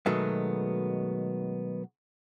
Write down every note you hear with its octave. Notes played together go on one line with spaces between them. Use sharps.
B2 D#3 F#3 G#3 A3 B3